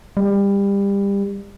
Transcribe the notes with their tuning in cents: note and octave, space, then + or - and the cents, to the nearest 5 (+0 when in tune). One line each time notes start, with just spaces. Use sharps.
G3 +25